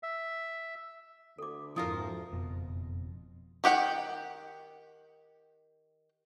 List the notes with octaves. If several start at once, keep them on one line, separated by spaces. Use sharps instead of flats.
E5
D2 A4 D6
F2 G#2 F3 E4 F4 A#4 D#6
F#1 F2 B2
D#3 G4 F#5 G5